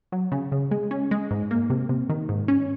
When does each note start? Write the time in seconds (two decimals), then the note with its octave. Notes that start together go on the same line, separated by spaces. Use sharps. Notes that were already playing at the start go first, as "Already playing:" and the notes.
0.12 F#3
0.32 C#3
0.52 C#3
0.71 G#3
0.91 C#4
1.11 G#3
1.31 G#2
1.51 A#3
1.70 C3
1.89 C3
2.09 D#3
2.29 G#2
2.48 C#4